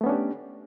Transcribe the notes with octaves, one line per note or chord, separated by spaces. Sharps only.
A3 B3 C#4 D4 G4